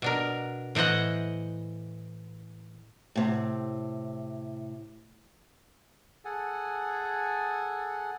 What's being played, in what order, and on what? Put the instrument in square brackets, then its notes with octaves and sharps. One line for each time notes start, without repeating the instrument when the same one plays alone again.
[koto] B2 D4 A#4
A2 E3 C5 D#5 F#5
[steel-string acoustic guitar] A2 C3
[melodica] G#4 A4 F#5 G#5